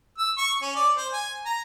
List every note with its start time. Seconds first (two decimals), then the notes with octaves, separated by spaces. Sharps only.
0.18 E6
0.38 C#6
0.62 C#4
0.75 D5
0.97 C5
1.13 G#5
1.45 A#5